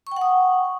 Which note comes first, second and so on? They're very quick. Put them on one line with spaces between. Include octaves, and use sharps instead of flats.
C#6 G5 F#5 D#6